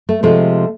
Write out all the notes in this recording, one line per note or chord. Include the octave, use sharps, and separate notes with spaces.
A3
C3 F3 G#3 A3